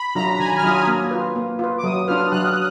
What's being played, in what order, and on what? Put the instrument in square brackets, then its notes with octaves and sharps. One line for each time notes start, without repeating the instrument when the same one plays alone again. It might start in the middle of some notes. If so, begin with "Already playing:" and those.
Already playing: [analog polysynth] B5
[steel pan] F#3 D4 F4 [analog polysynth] A#5
[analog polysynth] A#5
[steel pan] D#3 [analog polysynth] G#5
[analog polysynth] F6
[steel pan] F#3 D4 F4 [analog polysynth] D#6
[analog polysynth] F6
[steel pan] A#3
F4 B4
A#3
F4 B4
[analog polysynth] D6
[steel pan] F#3 [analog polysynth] D#6
[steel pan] D4 F4 B4 [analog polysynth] F6
[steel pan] F#3 [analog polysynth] F#6